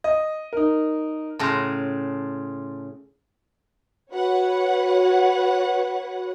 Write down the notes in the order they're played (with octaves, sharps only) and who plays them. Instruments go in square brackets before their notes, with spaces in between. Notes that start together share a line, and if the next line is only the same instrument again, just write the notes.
[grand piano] D#5
D#4 A#4
[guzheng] A2 C#3 A#5 [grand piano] A5 C6
[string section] F#4 B4 C#5 F#5